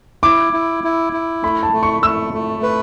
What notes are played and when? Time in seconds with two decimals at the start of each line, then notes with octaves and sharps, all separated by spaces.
0.23 E4 D6
0.53 E4
0.84 E4
1.13 E4
1.43 A3 B5
1.63 A5
1.73 A3
1.83 C#6
2.03 A3 E6
2.34 A3
2.63 B4